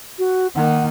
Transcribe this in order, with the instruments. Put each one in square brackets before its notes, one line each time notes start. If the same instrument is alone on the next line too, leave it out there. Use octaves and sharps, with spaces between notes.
[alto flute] F#4
[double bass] D#3 A#3 [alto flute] F#5